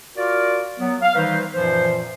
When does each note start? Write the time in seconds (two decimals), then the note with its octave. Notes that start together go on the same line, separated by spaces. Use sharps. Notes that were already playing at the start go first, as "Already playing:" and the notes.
0.17 F4 F#4 A#4 D5
0.78 F#3 B3
1.02 F5
1.16 D#3 E3 G3 D#4 B4 C5
1.55 F#2 A#2 E3 F3 C5